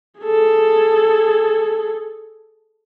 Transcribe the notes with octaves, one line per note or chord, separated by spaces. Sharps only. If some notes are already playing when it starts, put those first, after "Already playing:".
G#4 A4